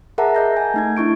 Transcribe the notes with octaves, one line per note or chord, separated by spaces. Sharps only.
G#4 A#4 E5 F#5 A5 A#5
D#5 G6 A#6
G#5 A5
A3 D#4 G#6
D4 E4 C#6 D7